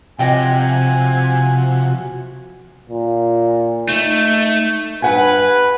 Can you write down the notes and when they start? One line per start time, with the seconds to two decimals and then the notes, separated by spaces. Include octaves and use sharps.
0.19 C3 F3 F#4 C#5 D#5 G5 G#5
2.90 A#2
3.89 A3 D#4
5.02 G2 B4 F#5 G#5